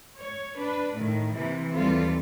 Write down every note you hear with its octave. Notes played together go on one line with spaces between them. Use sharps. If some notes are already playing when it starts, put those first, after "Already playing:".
C#5
D4 B4
A2 D#3 A3
C3 E3 A#3
D#2 E3 G3 C4 F4 A4